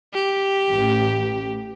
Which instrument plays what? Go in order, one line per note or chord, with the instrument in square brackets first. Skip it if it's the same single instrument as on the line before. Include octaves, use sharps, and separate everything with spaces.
[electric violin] G4
[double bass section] A1